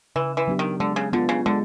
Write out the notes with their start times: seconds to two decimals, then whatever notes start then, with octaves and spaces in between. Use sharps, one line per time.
0.16 C#3 E3
0.37 E3
0.48 F#3 B3 D4 G4
0.59 D#3
0.80 D3 G#3
0.96 C#3
1.13 D3 B3 D4 F4
1.29 C#3
1.46 D3 G#3